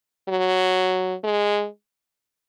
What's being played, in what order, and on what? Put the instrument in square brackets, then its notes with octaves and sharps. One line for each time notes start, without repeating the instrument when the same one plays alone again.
[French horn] F#3
G#3